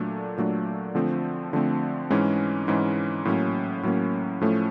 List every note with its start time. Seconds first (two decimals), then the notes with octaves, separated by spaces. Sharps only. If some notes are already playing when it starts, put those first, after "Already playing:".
Already playing: A#2 F#3 A3 D4
0.38 A#2 F#3 A3 D4
0.95 D3 F3 A3 C4
1.53 D3 F3 A3 C4
2.10 G#2 E3 G#3 C#4
2.68 G#2 E3 G#3 C#4
3.25 A2 F#3 A#3 C#4
3.83 A2 F#3 A#3 C#4
4.41 A2 F3 A3 C#4